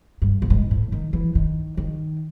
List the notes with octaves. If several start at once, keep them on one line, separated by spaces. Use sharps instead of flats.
G2
A2
G#2
A2
D#3
E3
D#3
D#3